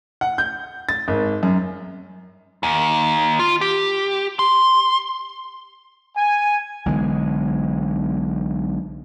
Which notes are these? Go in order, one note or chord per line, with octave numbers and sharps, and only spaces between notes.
F#5
G6
A6
G#1
F#2
D#2
F4
G4
C6
G#5
B1 D3 E3 G#3